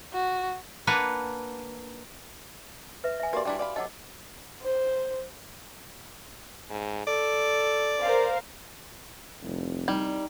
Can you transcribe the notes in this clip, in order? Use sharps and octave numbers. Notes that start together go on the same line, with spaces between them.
F#4
A#3 D4 B4 F#5 G#5 A#5
B4 E5
E5 G#5
A#3 F#4 G4 D5 C6
G3 D4 E4
D5 F5 B5
F#3 A4 D#5 D6
C5
G#2
A4 D5
A#4 C5 F5
F1 C2
G3 D#4